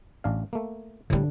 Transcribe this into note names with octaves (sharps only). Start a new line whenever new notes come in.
A1 D4 F5
A3 A#3
A2 D3 G3 D4